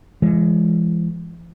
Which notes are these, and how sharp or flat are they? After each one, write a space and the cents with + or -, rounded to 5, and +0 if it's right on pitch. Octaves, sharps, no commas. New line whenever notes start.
E3 +40 G#3 +0